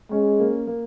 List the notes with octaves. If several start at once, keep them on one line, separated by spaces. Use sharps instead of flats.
G#3 C#4
A#3
A#3